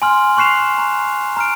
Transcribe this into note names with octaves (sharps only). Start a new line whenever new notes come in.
G#5 C6 F6
C6 C#6 F#6 C7 E7 F7
A#5
A#5 F6 D7